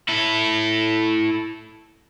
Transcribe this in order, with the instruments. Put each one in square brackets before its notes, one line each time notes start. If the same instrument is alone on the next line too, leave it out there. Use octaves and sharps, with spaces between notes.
[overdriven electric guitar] E4 A4